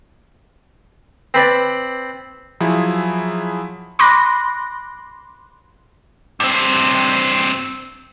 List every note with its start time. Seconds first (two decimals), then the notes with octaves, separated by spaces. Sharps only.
1.34 C4 B4 D5
2.60 F3 F#3 E4 G#4
3.99 B5 C6 D6 F#6 A#6
6.40 G2 C4